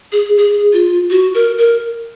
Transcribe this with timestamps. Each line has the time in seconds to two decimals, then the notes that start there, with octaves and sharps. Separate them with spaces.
0.12 G#4
0.38 G#4
0.73 F4
1.10 F#4
1.35 A#4
1.58 A#4